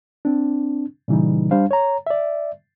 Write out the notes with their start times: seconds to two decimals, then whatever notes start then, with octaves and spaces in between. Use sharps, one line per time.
0.25 C4 D4
1.08 A#2 C#3 E3 G3 D#4
1.51 G3 D4 C5 F5
1.71 C#5 A#5
2.07 D5 E5